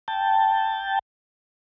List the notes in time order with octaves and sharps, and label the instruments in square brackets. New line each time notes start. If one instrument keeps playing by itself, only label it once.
[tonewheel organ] G5 A5